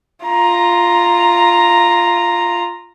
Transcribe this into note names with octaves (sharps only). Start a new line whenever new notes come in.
F4 A#5